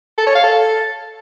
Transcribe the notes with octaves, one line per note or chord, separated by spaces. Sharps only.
A4
C#5
F5
A4